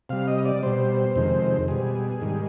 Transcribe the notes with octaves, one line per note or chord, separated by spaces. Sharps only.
C3 G3 F5
D#5
D5
B2 G3 C5
F2 C3 D#3 G#3
B2 G3 G#4
G#2 D#3 G3